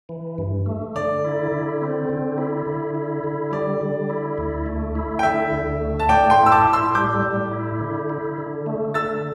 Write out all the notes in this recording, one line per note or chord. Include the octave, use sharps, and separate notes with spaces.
E3
G2
A3
D3 D5
E4
D3
C4
D3
E4
D3
E4
D3
G3 D5
D3
E4
D2
A3
E4
G5
D3 E5
D2
A3
A5
A2 D5 G5
G5 C6
E4
E6
A5 D6
A2
C6 E6
G3 D6 G6
A2
E4
D3
E4
D3
A3
D3 E6 A6